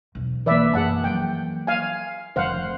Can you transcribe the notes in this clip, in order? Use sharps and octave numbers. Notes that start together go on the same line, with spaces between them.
B1 E2
E3 A#3 B4 D5 E5
F#2 G#4 F#5 A5
F3 F#3 G5
F5 G#5
F1 D3 F3 C5 F5 F#5